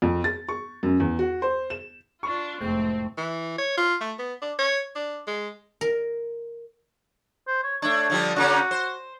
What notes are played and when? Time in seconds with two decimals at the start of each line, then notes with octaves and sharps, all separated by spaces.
0.02 F2
0.24 A6
0.49 C#6
0.83 F#2
1.00 E2
1.19 F#4
1.42 C5
1.70 E7
2.23 D4 F4 C#6
2.61 F1 A2 G#3 A3 C4 G5
3.17 E3
3.58 C#5
3.77 F4
4.01 A3
4.19 B3
4.42 D4
4.58 C#5
4.95 D4
5.27 G#3
5.81 A#4
7.48 C5
7.64 C#5
7.82 A3 D4 C#5
8.10 D3 F3 G3
8.36 C#3 A#3 C#4 F#4
8.71 C5